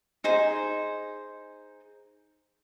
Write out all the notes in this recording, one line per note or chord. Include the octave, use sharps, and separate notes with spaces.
D#4 G#4 C5 C6